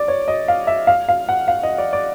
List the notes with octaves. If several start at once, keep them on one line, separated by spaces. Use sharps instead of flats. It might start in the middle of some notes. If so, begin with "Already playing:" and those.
Already playing: D5
C#5
D#5
F5
E5
F5
F5
F#5
F5
D#5
D5
D5